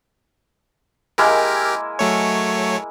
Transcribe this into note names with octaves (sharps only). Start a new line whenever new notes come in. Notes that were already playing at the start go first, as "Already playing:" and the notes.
G#3 A#3 E4 G4 A#4
F#3 A3 C#5